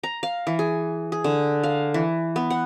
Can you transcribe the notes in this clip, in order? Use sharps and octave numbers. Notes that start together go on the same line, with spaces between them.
A#5
F5
E3
G#4
G#4
D3
F5
E3
B3
F#5